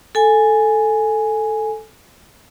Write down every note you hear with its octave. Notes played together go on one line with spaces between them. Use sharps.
A4 G#5